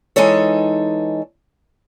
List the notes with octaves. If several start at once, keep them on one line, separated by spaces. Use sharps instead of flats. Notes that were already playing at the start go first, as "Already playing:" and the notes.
E3 G#3 D#4 G#4 A4 C#5